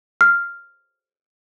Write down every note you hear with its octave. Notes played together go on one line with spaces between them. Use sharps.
F6